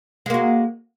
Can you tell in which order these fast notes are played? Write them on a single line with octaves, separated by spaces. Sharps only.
G#3 A#3 F#4